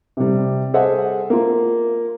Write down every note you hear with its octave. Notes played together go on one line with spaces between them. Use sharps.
C3 G3
G#4 A4 C5 D#5 E5 F#5
A#3 F4